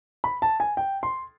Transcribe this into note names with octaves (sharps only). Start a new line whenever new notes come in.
B5
A5
G#5
G5
C6